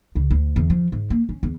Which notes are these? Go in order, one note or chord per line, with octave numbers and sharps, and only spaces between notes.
C#2
D2
E2
F3
G#2
A#3
C#4
E2